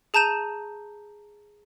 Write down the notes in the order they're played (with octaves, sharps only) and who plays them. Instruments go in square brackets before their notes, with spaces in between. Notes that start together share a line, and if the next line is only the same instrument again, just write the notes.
[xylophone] G#4 A5 A#5 G6 D#7 E7